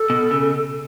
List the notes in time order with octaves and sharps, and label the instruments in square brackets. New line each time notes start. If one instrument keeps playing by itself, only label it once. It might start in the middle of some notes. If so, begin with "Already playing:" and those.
Already playing: [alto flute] A4
[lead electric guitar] B2
C#3